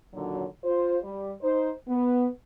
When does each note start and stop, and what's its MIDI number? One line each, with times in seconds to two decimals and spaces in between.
0.14 0.45 46
0.14 0.45 50
0.14 0.45 51
0.14 0.45 54
0.64 0.98 65
0.64 0.98 72
1.03 1.32 55
1.42 1.71 63
1.42 1.71 72
1.88 2.28 59